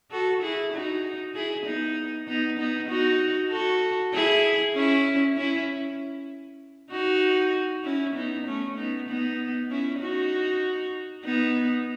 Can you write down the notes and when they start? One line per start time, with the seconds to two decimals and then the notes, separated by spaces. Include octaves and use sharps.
0.11 F#4 A4
0.42 E4 G#4
0.73 D#4 F#4
1.35 E4 G#4
1.66 B3 D#4
2.28 B3 D#4
2.58 B3 D#4
2.89 D#4 F#4
3.51 F#4 A4
4.14 E4 G#4
4.75 C#4 E4
5.37 C#4 E4
6.91 D#4 F#4
7.84 C#4 E4
8.15 B3 D#4
8.46 A3 C#4
8.78 B3 D#4
9.08 B3 D#4
9.70 C#4 E4
10.01 D#4 F#4
11.25 B3 D#4